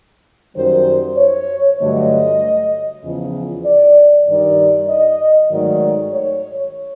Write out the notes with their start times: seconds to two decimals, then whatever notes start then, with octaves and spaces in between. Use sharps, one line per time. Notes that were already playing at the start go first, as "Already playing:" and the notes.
0.56 F#2 D#3 G3 C5
1.17 C#5
1.80 G2 D3 F#3 A3 D#5
3.03 E2 C#3 F3
3.65 D5
4.27 G2 D#3 G3 D5
4.88 D#5
5.51 G#2 D#3 F#3 A3 D5
6.13 C#5